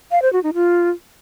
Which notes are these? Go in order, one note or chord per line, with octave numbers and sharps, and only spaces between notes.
F5
C5
F#4
D#4
F4